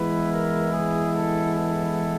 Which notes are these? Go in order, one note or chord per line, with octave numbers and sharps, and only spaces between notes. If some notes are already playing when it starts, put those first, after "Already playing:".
Already playing: E3 G#3 B3 E4 B4
A#4
G#4
A4
A4